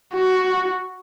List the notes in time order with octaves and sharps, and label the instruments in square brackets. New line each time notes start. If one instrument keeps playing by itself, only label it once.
[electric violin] F#4